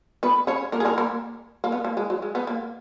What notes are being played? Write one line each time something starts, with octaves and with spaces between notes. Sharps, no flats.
B3 B4
C#4 C#5
A#3 A#4
G#4
A#3 A#4
A#3 A#4
A#3
B3
A#3
G#3
F#3
G#3
B3
A#3